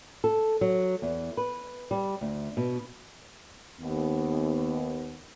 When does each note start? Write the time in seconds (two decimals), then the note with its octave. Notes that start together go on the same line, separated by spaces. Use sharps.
0.24 A4
0.61 F#3
1.02 E2
1.37 B4
1.91 G3
2.21 D2
2.57 B2
3.81 D#2 B3